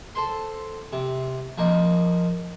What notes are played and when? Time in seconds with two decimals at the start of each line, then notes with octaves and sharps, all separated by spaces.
0.15 A4 C5 C6
0.93 C3
1.58 F3 A#3 D#4